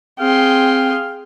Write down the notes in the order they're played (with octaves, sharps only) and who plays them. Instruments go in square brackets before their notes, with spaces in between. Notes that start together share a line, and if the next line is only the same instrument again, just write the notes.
[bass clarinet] C4 [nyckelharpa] G#4 C6 [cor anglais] F5 [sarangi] G5